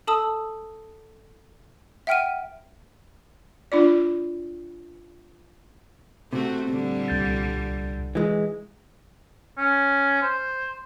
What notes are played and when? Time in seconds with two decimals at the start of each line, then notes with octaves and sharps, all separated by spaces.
0.07 A4 A5 D#6 E6
2.07 E5 F#5 G5 F6 D7 D#7
3.72 D4 F4 D5
6.33 C3 A3 C4 F#4
6.68 A#2 D3 G3
7.08 C2 G6 A6
8.15 E3 G#3
9.58 C#4
10.22 C5